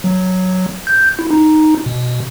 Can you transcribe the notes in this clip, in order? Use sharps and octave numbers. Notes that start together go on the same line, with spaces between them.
F#3
G6
E4
D#4
B2